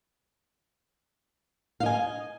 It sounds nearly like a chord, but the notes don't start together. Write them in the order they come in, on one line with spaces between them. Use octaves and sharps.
F5 D#5 G#5